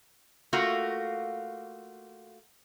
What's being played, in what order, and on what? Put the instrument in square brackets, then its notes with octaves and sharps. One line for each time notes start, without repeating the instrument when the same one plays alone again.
[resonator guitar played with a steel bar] A3 A#3 F4 F#4